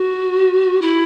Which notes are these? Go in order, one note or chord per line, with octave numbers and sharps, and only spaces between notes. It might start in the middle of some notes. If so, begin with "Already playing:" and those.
Already playing: F#4
E4